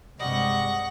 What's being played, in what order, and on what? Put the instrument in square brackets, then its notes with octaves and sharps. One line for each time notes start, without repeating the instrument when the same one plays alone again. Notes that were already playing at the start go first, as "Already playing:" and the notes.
[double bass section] G2 C3 G#3 [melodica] G3 D#5 [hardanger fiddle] F#5 C#6